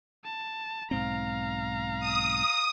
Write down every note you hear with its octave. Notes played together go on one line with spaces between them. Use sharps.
A5
B1 G#2 C4 F5 A#5
D#6